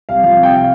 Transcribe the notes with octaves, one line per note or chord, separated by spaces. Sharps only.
C2 F5
F3 F5
C3 G5
F5